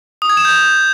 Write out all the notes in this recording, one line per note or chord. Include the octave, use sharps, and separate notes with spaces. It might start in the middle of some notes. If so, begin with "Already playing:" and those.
D#6
G#6
E7
G6